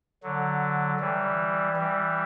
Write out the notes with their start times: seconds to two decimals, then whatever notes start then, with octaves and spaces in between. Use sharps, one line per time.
0.23 D3 F#3
1.00 E3 G3
1.76 E3 G3